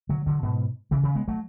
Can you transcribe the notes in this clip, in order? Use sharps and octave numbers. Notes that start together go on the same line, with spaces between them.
D3 F#3
D3 F#3
G#2 B2
C#3 E3
C#3 E3
G#3 B3
F#3 A3